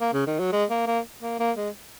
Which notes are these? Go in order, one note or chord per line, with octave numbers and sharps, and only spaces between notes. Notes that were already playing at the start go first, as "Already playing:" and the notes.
A#3
C#3
D#3
F#3
G#3
A#3
A#3
A#3
A#3
G#3